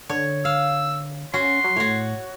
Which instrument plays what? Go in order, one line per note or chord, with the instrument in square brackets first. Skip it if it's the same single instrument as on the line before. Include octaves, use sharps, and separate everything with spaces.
[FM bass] D3 [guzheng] C#5
[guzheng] F5 [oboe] E6
[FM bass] C#4 [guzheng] F#4 [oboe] C6
[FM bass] F#3
[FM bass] A2 [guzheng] F#4 C#5